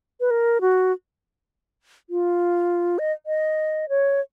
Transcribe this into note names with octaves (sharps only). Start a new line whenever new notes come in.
B4
A#4
F#4
F4
D#5
D#5
C#5